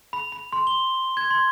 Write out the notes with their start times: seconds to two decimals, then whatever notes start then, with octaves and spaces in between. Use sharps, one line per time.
0.13 B5
0.32 B5
0.53 C6
0.67 G7
1.17 G#6
1.31 C6